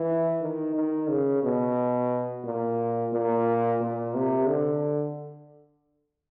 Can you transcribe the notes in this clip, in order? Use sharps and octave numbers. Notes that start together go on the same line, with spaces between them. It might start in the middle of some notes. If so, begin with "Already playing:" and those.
Already playing: E3
D#3
D#3
C#3
B2
A#2
A#2
A#2
C3
D3